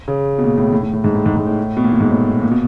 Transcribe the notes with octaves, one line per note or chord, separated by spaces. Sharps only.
C#3
B2
A#2
A2
A2
A2
A2
G#2
A2
G#2
G#2
A2
B2
A#2
A2
G#2
A2
B2
A#2
B2